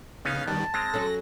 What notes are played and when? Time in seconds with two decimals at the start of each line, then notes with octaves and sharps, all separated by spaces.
0.25 C#3 B3 C#4 D#4 F5
0.47 D#3 G3 A5
0.74 G#3 C4 A#6
0.94 F#3 C#4 A4